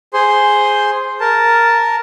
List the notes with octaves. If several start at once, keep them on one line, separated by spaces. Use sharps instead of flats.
G#4 C5 C6
A#4 A5